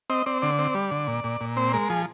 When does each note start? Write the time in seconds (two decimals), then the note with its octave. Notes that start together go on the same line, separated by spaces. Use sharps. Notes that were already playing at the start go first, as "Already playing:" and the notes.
0.10 C4 D#5
0.26 C4 D5
0.42 D3 D5
0.59 C4
0.75 G3
0.91 D3
1.08 A#2
1.24 A#2
1.41 A#2
1.57 C4 C5
1.73 G#3 A#4
1.90 F3 G#4